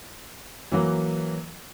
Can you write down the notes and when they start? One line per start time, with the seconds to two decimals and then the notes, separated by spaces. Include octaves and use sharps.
0.72 E3 F#3 A#3